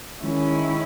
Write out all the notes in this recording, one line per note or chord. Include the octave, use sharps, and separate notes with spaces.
D#3 G#3 C#4 E4